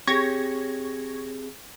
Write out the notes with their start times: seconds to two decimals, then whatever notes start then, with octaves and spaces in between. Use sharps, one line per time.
0.07 C4 G4 G#4 C#5 C#6 G#6 A#6